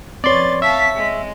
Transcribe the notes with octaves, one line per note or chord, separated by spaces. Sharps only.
F2 C4 B4 C#5 D5 C6 A6
E5 F5 A5 C#6 B6
G#3